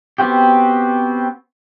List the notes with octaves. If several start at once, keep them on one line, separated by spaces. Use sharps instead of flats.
B3 C4 F#4 G4